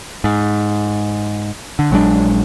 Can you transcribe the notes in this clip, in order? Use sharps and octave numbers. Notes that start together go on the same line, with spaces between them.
G#2
D3
A#1 F#3 G#3 D4